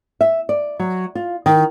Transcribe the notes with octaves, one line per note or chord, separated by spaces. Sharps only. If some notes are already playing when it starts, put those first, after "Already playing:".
E5
D5
F#3
F4
D#3